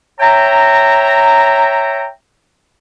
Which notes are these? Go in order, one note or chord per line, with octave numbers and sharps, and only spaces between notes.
C#5 E5 G5 A#5